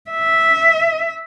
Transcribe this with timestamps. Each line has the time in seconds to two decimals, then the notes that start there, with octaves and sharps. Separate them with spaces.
0.10 E5